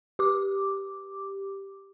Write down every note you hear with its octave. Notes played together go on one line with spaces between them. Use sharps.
G4 D6